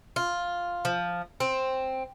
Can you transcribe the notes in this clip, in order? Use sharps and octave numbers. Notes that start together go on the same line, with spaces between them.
F4
F3
C4